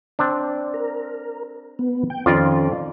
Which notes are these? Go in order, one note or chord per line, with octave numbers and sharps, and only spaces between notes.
C4 D4
A#4
B3
G5
F2 D#3 C#4 F4 D5